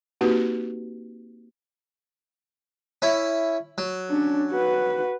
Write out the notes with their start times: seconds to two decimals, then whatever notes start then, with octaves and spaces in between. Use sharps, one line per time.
0.21 A#3 C4 D#4 F#4 G4 B4
3.02 C#4 E4
3.78 F#3
4.11 C#4 D4
4.52 F#4 B4